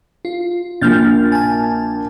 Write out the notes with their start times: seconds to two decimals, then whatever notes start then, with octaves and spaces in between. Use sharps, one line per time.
0.25 F4
0.81 A#1 A#2 F6 G6 A6
1.32 G#5 A5